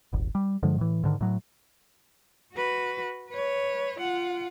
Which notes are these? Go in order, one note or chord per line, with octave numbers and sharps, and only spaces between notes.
D#1 G#1
G3
G2 D3 F3 G#3
A2 E3
G#2 D3 D#3
A2 F#3
F#4 B4
B4 C#5
F4 F#5